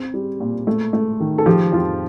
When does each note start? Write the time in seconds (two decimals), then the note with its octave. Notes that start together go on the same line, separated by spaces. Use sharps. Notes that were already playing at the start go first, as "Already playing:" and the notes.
Already playing: C4 C5
0.14 G3
0.40 A#2
0.67 A3
0.93 A3
1.20 D#3
1.38 A4
1.46 F3 G4
1.72 F2 F4